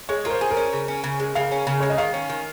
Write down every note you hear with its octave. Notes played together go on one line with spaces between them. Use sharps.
G#3 C#5
F4 A#4
C5
G#4
A#4
C#4
C#3
C#4
C#3
G#3
C#3 F5
C#4
C#3
G#3 C#5
D#5
D#3 F5
C#4
D#3